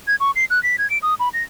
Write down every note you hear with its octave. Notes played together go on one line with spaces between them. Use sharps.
G#6
C#6
C7
F#6
B6
G#6
D7
D#6
B5
A#6